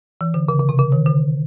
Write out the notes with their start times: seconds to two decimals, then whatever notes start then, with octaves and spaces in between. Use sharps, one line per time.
0.21 E3
0.34 D3
0.48 C#3
0.59 C#3
0.69 C3
0.78 C#3
0.92 D#3
1.06 D3